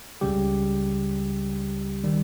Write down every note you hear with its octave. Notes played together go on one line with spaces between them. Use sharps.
C#2 C#3 G3 G4
D#3 G3